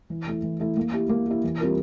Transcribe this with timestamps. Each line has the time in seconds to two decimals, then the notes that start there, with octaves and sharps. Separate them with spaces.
0.10 E3
0.27 A3 E4
0.43 E3
0.59 A3 E4
0.76 A#3
0.93 E4 G4
1.09 A#3
1.26 E4 G4
1.44 E3
1.60 G3 C4 F4 A#4